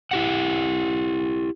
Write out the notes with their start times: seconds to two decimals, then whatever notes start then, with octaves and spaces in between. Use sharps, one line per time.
0.11 E4 G4 F#5